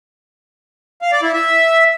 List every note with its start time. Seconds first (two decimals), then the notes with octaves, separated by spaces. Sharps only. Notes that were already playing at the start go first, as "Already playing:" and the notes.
1.02 F5
1.12 D5
1.23 E4
1.33 E5